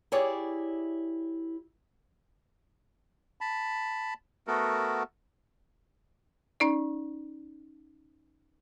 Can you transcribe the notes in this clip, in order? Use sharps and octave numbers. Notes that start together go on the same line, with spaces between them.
E4 G4 G#4 C#5 D5
A5 B5
A3 B3 F#4 A4 A#4
C#4 D#4 D5